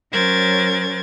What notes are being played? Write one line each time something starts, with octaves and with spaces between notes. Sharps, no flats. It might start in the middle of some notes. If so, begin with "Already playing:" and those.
F#3 C#4 A#4 C5 G#6 A6